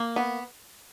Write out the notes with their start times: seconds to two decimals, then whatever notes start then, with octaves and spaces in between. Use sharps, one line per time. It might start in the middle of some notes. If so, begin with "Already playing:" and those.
Already playing: A#3
0.16 B3